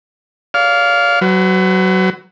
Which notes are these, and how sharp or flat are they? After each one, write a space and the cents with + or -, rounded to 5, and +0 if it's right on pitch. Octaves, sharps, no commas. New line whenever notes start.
D5 -45 F5 +0
F#3 +20 B4 +45